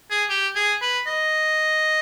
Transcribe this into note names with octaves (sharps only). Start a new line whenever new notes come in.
G#4
G4
G#4
B4
D#5